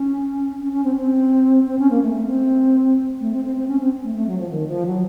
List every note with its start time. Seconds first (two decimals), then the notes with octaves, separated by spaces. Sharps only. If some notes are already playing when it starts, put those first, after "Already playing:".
Already playing: C#4
0.60 C#4
0.72 C#4
0.84 C4
0.96 C4
1.67 C4
1.79 C#4
1.90 A#3
2.02 A3
2.15 A3
2.27 C4
3.21 A3
3.33 C4
3.45 C4
3.56 C4
3.68 C#4
3.80 C4
4.04 A3
4.15 A3
4.27 F#3
4.39 F3
4.51 D#3
4.68 F3
4.86 F#3